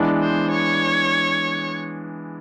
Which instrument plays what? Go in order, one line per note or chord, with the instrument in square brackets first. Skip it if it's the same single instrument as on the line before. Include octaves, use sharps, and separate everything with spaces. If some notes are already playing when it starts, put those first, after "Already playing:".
Already playing: [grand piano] E3 G#3 B3 D4
[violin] C5
C#5